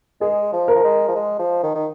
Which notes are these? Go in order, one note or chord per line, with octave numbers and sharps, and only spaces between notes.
G#3 G#4
F3
A#4
F3
G#3
F3
G#3
F3
D#3
D#3